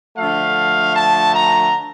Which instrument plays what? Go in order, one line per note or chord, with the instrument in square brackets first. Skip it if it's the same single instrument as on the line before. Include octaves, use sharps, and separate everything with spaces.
[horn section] D3 F3 A3 F5
A5
A#5